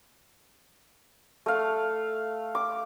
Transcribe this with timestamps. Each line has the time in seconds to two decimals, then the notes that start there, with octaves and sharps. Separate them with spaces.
1.46 A3 F5
2.55 D6